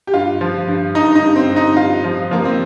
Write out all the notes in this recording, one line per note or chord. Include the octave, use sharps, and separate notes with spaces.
G4
G2 F4
F3
G2
G2 D#4
D#4
G2
C4
G2
D#4
G2 F4
F3
F3 A#3
C4